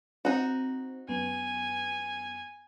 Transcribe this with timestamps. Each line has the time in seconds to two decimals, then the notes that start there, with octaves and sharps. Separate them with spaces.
0.25 C4 D#4 F#4 C5
1.09 F#2 B3 G#5